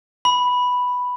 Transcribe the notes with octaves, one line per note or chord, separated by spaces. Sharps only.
B5